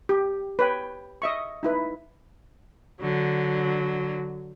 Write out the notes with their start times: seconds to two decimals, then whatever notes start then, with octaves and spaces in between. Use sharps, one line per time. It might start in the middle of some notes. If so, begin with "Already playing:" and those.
0.09 G4
0.59 B4 C#5 G5
1.22 D#5 E5 C#6
1.63 D#4 E4 B4
3.00 D3 F#3